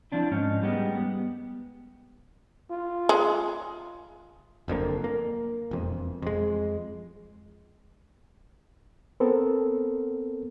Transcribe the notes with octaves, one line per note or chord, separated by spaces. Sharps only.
F3 C4 D4 E4
G#2 C#4 D#4
G3 G#3 B3 D#4 G4
B3
F4
G#3
F#1 F2 D3 A#3
A#3
E1 F2
F2 G#3
B3 C4 A4 A#4